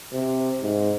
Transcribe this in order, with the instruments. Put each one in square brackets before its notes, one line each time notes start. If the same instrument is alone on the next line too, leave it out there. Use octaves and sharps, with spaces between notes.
[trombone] C3
G#2